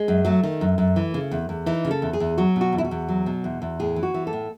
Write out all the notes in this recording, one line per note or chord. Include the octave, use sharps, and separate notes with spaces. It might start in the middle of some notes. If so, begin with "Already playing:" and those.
Already playing: G#3
F#2
F#3 A3
D#3
F#2
F#2
E3
C#3
E2
E2
E3 D#4
C#3
A4
E2
G#4
E2
F#3 F#4
B2 F#4
E2
E4
F#4
E2
F#3
B2
E2
E2
A2 G#4
E3
F#4
E3
A4
A2